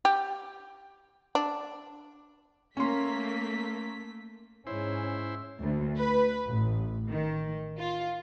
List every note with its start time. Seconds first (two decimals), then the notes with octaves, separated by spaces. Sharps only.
0.05 G4
1.35 D4
2.77 A3 A#3 C#4 C6 B6
4.67 G#2 C#4 E4 C5
5.61 D2
5.99 B4
6.47 A1
7.09 D#3
7.79 F4